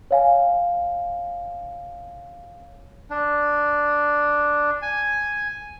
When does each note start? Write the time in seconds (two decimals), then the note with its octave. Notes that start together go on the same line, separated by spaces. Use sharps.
0.11 C#5 F5 G#5
3.10 D4
4.82 G#5